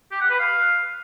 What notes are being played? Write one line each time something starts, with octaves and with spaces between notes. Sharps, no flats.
G4
F#5
B4
F5